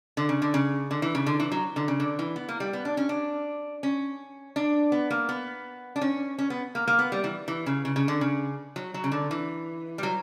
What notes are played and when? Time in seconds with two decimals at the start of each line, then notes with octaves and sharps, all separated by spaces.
0.17 D3
0.29 C#3
0.42 D3
0.54 C#3
0.91 D3
1.02 E3
1.15 C#3
1.26 D3
1.40 E3
1.52 F#3
1.76 D3
1.88 C#3
2.00 D3
2.19 E3
2.36 B3
2.49 A#3
2.60 G3
2.73 B3
2.85 D4
2.97 C#4
3.09 D4
3.83 C#4
4.56 D4
4.92 B3
5.10 A#3
5.29 B3
5.96 D4
6.01 C#4
6.38 C#4
6.50 B3
6.75 A#3
6.88 A#3
6.99 B3
7.12 G3
7.24 E3
7.48 E3
7.66 C#3
7.85 C#3
7.96 C#3
8.08 D3
8.21 C#3
8.76 F#3
8.94 F#3
9.04 C#3
9.12 D3
9.31 E3
9.98 G3
10.03 F#3